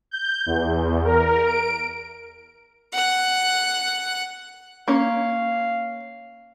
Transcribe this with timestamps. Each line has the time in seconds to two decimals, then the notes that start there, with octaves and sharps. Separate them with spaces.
0.11 G6
0.46 E2
1.05 A#4
1.46 D7
2.93 F#5 F#6
4.88 A#3 C#4 C#5 F5